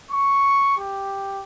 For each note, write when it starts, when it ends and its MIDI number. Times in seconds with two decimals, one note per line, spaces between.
0.11 0.77 85
0.77 1.42 67